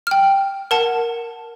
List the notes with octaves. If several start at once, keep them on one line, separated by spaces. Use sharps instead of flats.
G5 F6
A#4 F#5 A5